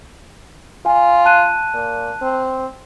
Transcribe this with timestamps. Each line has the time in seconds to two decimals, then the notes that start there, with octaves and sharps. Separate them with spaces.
0.86 F4 G#5
1.25 A5 F#6 D#7
1.74 A#2
2.22 C4